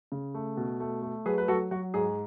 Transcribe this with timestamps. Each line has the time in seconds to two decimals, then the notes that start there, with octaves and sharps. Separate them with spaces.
0.12 C#3
0.34 A3
0.57 B2
0.80 A3
1.03 A3
1.25 F#3 G#4 B4
1.38 B4
1.48 F#3 F#4 A4
1.71 F#3 F#4
1.94 G#2 G#4